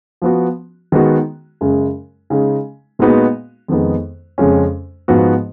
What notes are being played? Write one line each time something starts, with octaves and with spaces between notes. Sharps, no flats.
F3 B3 F#4
D#3 G#3 B3 F#4
F#2 C#3 G#3
C#3 G#3 D#4
A#2 G#3 B3 D#4 F#4
F2 D#3 G#3 B3 D#4
F2 C#3 G#3 C#4
G#2 F3 B3 F#4